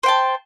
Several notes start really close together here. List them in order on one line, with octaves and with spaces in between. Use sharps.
C5 G5 A5